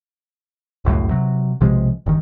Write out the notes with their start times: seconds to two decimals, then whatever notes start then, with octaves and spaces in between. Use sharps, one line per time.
0.85 G1 C#2 F#2 A2
1.11 C3 F#3
1.61 B1 C3 F3 G#3
2.06 G1 D#3